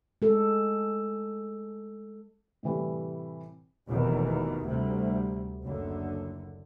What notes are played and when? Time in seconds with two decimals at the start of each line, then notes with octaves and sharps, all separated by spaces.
0.22 G#3 A4
2.63 A2 C3 E3 G3 A3
3.87 F1 E2 G#2 B2 D#3
4.64 D2 C3 G3
5.63 F#1 D3